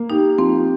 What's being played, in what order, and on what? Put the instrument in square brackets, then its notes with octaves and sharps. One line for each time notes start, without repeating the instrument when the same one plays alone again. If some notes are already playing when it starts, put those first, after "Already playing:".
Already playing: [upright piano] A#3
[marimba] D#4 [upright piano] G4
[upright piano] F3 [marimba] C4